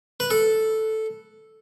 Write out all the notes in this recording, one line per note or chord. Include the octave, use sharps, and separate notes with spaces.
B4
A4